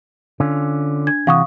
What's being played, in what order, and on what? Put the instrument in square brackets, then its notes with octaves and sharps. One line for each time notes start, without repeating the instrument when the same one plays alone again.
[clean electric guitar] D3 C#4 F4
[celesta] D4 G#6
[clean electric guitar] C3 E3 F#5 [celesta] F5 C#6 D#6